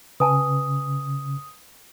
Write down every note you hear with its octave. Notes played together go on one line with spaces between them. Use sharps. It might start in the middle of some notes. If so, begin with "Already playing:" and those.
C#3 B4 G#5 A5 D#6